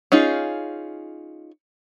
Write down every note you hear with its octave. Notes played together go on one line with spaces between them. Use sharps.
C#4 D#4 F4 G#4